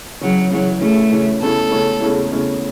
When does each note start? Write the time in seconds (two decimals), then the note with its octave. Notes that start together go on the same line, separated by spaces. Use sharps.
0.21 C#3 E3 F#3 C#4
0.51 C#3 E3 F#3 C#4
0.81 C#3 E3 A3 C#4
1.11 C#3 E3 C#4
1.41 E2 C#3 A3 C#4 E4 A4
1.71 E2 C#3 A3 C#4 E4
2.00 E2 C#3 A3 C#4 E4
2.31 E2 C#3 A3 C#4 E4